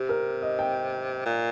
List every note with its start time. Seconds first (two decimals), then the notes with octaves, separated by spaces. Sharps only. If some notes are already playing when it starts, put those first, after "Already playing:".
Already playing: C3 G4
0.09 A#4
0.42 D#5
0.59 G5
1.26 A#2